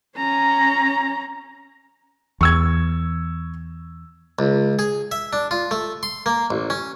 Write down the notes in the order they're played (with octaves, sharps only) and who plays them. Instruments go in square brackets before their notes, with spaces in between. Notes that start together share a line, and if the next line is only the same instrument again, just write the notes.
[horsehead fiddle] C#4 A#5
[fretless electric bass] E2 [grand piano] C#6 E6 G#6
[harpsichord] C#2
G#4
E5
D4
F4
A3
C6
A#3
A1
C#4